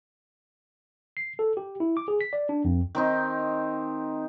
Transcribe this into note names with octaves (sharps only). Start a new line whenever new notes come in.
C7
A4
G4
E4
D6
G#4
B6
D5
D4
F2
D#3 C4 D#4